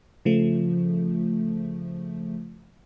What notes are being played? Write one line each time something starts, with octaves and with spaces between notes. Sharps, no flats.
C#3 F3 A3